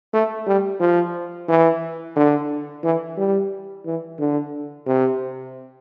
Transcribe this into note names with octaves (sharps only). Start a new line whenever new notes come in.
A3
G3
F3
E3
D3
E3
G3
E3
D3
C3